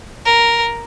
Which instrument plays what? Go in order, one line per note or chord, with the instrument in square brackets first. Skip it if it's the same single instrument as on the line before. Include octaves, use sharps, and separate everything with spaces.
[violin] A#4